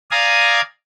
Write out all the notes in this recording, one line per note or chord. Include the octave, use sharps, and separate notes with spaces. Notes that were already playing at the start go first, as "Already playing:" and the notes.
D5 F5 G#5 A#5 D#6